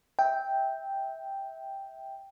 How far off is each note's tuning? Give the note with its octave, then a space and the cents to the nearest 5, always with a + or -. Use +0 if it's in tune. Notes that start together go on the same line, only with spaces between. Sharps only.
E5 -20 G5 +0